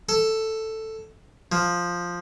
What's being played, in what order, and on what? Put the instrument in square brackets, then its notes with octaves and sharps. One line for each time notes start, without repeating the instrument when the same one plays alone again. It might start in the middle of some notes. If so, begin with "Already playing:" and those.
[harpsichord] A4
F3